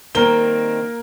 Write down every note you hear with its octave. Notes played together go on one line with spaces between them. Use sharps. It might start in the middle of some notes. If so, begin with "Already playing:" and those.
D#3 G3 A#3 C4 A#4 G7